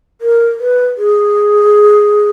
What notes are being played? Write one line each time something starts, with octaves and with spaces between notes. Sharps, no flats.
A#4
B4
G#4